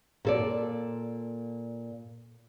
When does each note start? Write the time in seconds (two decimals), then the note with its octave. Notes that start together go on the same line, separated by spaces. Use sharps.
0.25 A#2 A4 D5